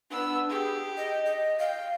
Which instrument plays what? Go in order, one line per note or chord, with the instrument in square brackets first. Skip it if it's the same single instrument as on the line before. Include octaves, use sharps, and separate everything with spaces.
[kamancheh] B3 E6 [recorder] D4
[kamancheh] G4 [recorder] G#4
[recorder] D#5
D#5
[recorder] F5 [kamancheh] G5